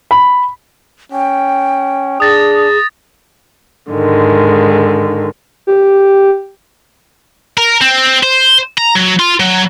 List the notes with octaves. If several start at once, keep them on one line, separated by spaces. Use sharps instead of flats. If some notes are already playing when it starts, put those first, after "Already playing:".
B5
C#4 G5
D4 G#4 D#6 A6 A#6
G#2 D3 D#3 G#3
G4
A#4
C4
C5
A#5
F#3
F4
F#3